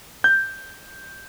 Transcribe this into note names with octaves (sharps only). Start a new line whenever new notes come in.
G6